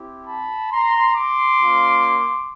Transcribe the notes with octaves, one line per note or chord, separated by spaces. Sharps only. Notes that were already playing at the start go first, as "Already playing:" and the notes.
Already playing: C4 E4 G4
A5 B5
A#5 C6
C6 D6
A#3 C#4 F4